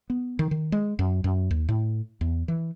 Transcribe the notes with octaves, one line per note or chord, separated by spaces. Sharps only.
B3
D#3
D#3
G#3
F#2
F#2
D#2
A2
E2
E3